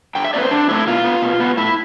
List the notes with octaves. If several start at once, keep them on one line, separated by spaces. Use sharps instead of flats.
D3 G5
E5
A3 C4 B4 D5
C5
D3 D4
A3 C4 E4
B2 F4
B3
B2
B3
A2 E4